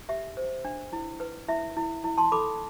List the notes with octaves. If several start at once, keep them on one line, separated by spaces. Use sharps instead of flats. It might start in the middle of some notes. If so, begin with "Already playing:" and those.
G4 E5
C5
D4
E4
B4
E4 E5
E4
E4
A5 C6
A4 B5 D6